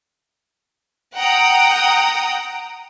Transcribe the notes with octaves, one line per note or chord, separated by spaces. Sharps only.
F#5 G5 A#5 D#6